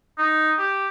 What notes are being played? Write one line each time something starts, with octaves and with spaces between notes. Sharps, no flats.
D#4
G4